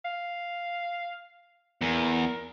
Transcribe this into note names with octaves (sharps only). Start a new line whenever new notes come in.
F5
E2 A#4